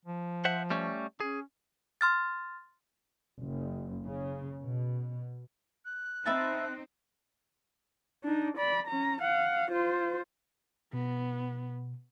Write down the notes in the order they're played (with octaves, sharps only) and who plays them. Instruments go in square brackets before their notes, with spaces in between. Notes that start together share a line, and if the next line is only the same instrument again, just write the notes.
[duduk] F3
[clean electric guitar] C5 E5 F#5
G3 A3 C#4
[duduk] C#4 [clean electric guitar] G#4
[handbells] C6 F6 A6
[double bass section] F#1
C#3
B2
[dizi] F#6
[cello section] C4 D#4 [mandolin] B4 E5 A5
[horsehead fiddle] D4 D#4
D5 B5
C#4 A#5
F5 F#5
F4 C5
[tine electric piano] B2 [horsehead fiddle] B3